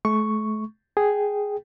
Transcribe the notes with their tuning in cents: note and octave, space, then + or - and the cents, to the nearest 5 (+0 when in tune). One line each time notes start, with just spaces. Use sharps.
A3 -40 C#6 +0
G#4 +0 G5 -10